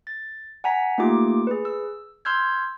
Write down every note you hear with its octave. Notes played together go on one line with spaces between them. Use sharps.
A6
F#5 G#5 A#5 B6
A3 A#3 D#4 F4 G4 D6
G#4 B4
E6
C6 E6 F6 G6 G#6